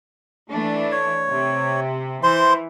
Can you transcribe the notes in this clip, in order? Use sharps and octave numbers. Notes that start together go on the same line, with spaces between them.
E3 A3 D4
C#5
C3
E3 C5 C6